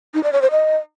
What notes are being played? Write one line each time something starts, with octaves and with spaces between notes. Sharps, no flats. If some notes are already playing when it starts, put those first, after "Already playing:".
D#4
D5
C#5
C5
D#5